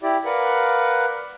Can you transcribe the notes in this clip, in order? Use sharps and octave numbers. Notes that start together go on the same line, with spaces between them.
E4 G4 D5
A#4 B4 D5 F5 F#5